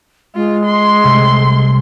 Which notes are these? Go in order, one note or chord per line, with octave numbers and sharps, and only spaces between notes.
G#3 F4
C6
C2 C3 A3